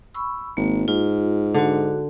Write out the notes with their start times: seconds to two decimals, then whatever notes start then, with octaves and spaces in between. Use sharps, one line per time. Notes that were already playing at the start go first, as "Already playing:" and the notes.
0.15 B5 C#6 E6
0.57 G#1 A#3
0.88 G#2 F4
1.54 D3 D4 F#4